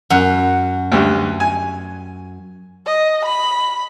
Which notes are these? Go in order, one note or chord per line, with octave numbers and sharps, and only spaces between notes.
F#2 F#5
D2 G2
G#5
D#5
B5